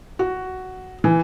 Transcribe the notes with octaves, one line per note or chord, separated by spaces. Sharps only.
F#4
E3